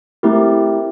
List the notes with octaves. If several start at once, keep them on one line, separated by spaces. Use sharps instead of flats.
A3 C4 E4 G4 A#4